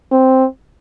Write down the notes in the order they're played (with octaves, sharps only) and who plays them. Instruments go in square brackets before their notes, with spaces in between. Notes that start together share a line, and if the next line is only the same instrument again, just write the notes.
[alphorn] C4